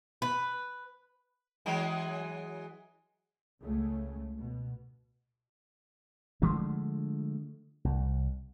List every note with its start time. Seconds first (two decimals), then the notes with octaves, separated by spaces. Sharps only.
0.22 B4
1.66 E3 F#3 G#3
3.61 C#2 C#3 A3
4.37 B2
6.42 D3 F3 G#3 A3
7.85 C2